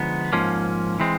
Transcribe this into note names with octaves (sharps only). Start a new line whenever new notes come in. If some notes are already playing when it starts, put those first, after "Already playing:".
Already playing: D3 F3 G#3 B3 D#4
G#2 F3 A#3 C#4
E3 G#3 C4